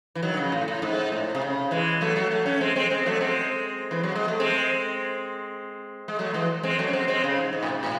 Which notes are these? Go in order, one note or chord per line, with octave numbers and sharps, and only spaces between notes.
E3
D#3 F#3
D#3
C#3
A2
A2
G#2
A2
C3
C#3
E3 G#3
F#3 A3
F#3 A3
F#3 A3
A3 C#4
G#3 C4
G#3 C4
G#3 C4
F#3 A3
G#3 C4
E3
F#3
G#3
A3
G#3 C4
G#3
F#3 A3
E3 G#3
G#3 C4
F#3 A3
C#4
G#3 C4
G#3 C4
C#3
G#2
G#2
A2
C3
A2